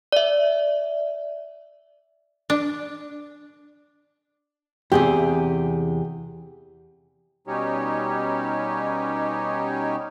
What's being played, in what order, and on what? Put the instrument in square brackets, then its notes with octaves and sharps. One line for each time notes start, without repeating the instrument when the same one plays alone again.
[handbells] D5 E5
[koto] D4
[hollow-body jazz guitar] E2 C3 [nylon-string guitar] G4 G#4
[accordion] B2 G3 C#4 D#4 G4 C#5